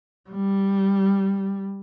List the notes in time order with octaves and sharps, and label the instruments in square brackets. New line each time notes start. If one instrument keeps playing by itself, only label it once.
[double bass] G3